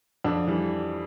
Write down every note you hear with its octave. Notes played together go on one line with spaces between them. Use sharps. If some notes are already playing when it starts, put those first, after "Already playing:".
F2 D4
E3 G3